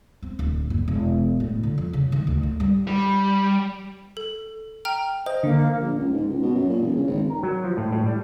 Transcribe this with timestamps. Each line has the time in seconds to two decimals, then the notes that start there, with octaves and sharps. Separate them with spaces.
0.22 C4
0.39 D1
0.70 F#1
0.88 E1
1.40 A2
1.63 D3
1.78 F2
1.93 C#3
2.12 D#3
2.27 D2
2.43 D#4
2.60 G3
2.87 G3
4.17 A4
4.85 G5 A#5 F6
5.26 C5 D#5
5.43 D3 A#3
5.79 A#1
5.98 C#2
6.13 G#2
6.29 C#2
6.42 B2
6.55 F#2
6.69 A#2
6.82 E1
6.96 C#3
7.07 G#1
7.30 A#4
7.43 F#3
7.64 F3
7.77 A2
7.92 A2
8.06 G3